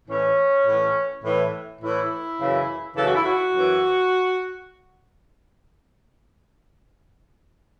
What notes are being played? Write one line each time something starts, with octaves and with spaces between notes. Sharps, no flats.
A2 E3 C#4
A2 E3
A2 E3
A2 E3 E4
F#2 C#3 E3
F#2 C#3 E3 A4
F#4
E4
F#4
F#2 E3